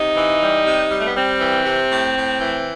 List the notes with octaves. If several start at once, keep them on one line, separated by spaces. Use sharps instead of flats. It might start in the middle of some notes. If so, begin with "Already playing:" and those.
Already playing: C3 D#4
E3
G3
C3
G3
A3
B3
G3 C4
E3
C3
A2
A2
E3